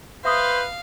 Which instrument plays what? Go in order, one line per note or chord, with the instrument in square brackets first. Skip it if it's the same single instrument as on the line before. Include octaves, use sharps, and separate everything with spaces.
[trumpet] B4 [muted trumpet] C5 [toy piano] E5 D#6 [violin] F5